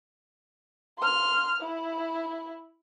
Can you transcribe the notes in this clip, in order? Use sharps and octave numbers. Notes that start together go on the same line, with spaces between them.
C6 F6
E4